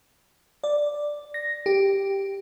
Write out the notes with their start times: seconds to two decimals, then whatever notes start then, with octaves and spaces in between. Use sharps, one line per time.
0.64 D5
1.34 A#6
1.66 G4